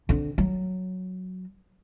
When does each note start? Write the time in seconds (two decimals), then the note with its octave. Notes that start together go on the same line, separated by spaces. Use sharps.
0.09 D3 C4
0.38 F#3